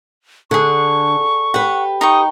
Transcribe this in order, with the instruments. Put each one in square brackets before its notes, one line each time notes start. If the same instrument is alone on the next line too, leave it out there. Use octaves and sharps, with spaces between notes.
[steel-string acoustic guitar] D3 [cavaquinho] G#4 F#5 [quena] C#6
[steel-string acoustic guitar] G4 B4 [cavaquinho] F#5
[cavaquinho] D#4 G5 C#6 [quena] D#6